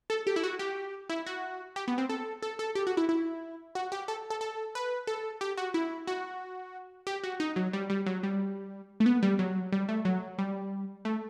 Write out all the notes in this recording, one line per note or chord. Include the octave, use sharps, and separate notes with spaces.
A4
G4
E4
F#4
G4
E4
F#4
G4
B3
C4
A4
A4
A4
G4
F#4
E4
E4
F#4
G4
A4
A4
A4
B4
A4
G4
F#4
E4
F#4
G4
F#4
D#4
F#3
G3
G3
F#3
G3
A3
B3
G3
F#3
G3
A3
F#3
G3
A3